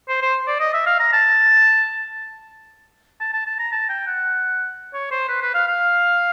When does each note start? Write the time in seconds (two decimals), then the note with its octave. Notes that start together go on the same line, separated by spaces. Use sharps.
0.09 C5
0.22 C5
0.47 D5
0.60 D#5
0.74 E5
0.86 F5
0.99 A#5
1.13 A5
3.20 A5
3.33 A5
3.46 A5
3.59 A#5
3.72 A5
3.89 G5
4.07 F#5
4.94 C#5
5.11 C5
5.28 B4
5.41 B4
5.54 F5
5.67 F5